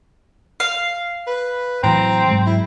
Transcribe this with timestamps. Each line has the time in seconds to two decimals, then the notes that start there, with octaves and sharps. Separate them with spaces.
0.60 F5
1.27 B4
1.83 A2 E3 F#3 C4 A#5
2.28 G#2 F#3 G#3
2.46 E4